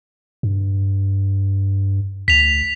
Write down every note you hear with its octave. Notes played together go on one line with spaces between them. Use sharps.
G2
D2 B6 F7